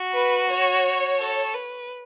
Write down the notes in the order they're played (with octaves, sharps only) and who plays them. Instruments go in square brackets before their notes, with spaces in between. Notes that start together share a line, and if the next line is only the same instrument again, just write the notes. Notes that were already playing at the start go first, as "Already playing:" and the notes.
Already playing: [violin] F#4
[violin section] B4
C#5
[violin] A4
B4